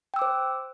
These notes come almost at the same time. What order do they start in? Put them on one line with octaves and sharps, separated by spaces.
G5 E6 D6 C5